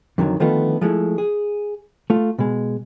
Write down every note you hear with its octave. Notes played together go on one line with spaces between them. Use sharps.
F2 D3 D#3 F#3
D3 D#3 F3 A3 B3 F4
F3 G#3 A3 E4
G#4
A3 F4
B2 G#3